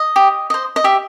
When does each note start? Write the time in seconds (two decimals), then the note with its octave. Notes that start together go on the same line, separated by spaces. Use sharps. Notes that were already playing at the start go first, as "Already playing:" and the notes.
Already playing: D#5
0.16 G4
0.50 C5 D#5
0.76 D#5
0.84 G4 E5